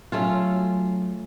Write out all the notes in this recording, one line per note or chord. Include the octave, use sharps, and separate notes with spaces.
F#3 A3 C#4 F4